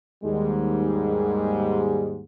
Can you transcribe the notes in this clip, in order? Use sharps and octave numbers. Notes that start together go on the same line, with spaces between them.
D#2 G#2 G3 G#3